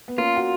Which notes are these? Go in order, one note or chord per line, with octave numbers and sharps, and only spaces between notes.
B3
A#3 C#4 F4
F#4